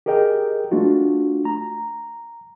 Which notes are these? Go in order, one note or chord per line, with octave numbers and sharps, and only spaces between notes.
G4 G#4 A#4 D#5 G5
A3 D4 F4 F#4
A#5